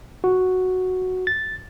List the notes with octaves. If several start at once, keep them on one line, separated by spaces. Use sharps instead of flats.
F#4
A6